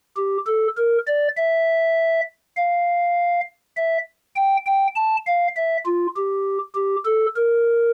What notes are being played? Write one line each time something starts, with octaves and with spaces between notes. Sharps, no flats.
G4
A4
A#4
D5
E5
F5
E5
G5
G5
A5
F5
E5
F4
G4
G4
A4
A#4